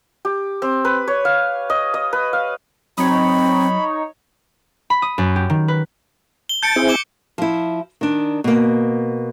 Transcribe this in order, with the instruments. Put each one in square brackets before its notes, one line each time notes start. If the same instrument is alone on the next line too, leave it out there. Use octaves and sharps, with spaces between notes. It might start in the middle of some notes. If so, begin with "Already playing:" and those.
[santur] G4
C4
B4
C#5
F5
D#5
D#5
B4
F5
[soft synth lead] F#3 [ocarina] C4 [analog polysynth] D#4 C#5 [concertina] B5
[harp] B5
D#6
F#2
G4
D#3
B4
[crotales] G7
[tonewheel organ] A5 [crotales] G6 C#7 D7
[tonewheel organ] C4 E4 G#4
[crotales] D6 G7
[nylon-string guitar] F3 E4
D#3 D4
B2 A#3